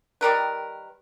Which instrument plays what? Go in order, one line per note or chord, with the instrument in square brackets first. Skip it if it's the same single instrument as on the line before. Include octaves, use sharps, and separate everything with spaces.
[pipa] D#3 G3 A#4 B4